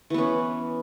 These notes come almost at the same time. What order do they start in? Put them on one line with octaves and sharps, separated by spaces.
E3 B3 C#4